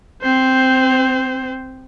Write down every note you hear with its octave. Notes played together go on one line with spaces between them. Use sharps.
C4 C5